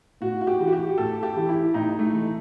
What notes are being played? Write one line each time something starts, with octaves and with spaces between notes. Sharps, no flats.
A2 F#4
F#4
G4
E3
F#4
G4
A2 A4
G4
E3
E4
A2 D#4
A3
E3